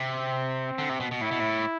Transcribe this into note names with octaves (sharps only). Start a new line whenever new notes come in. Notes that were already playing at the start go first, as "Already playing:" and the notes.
Already playing: C3 C4
D3
C3
B2
B2
A2 E4
B2
A2